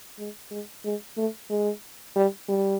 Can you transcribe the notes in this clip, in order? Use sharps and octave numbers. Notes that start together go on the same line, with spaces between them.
G#3
G#3
G#3
A3
G#3
G3
G3